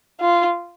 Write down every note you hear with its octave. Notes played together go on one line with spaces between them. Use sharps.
F4